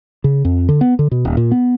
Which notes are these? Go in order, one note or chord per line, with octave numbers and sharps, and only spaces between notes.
C#3
F2
D3
B3
D3
B2
D#1
A#2
B3